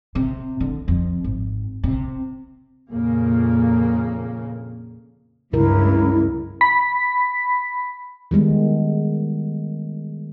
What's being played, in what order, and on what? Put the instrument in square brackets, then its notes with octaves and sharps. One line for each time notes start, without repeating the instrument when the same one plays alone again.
[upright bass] C3
D3
F2
G#1
C3
[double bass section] F2 A#2 C#3 A#3
[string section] C#2 G2 [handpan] C#3 A#4 [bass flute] E4
[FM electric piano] B5 B6
[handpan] D#3 G3 G#3 B3